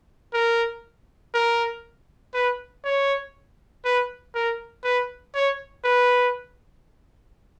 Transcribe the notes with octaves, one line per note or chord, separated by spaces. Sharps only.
A#4
A#4
B4
C#5
B4
A#4
B4
C#5
B4